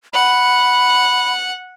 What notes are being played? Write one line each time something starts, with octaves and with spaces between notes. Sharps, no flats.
F#5 B5